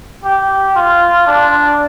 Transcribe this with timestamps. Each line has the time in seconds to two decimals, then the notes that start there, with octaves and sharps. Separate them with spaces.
0.24 G4
0.76 F4
1.27 D4